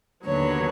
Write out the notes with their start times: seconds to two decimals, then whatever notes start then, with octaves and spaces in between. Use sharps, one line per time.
0.25 D#2 D3 F#3 B3 C#5